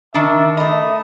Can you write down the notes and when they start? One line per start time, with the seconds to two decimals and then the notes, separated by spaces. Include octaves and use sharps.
0.14 D#3 D4 E5
0.57 A3 D#5 B5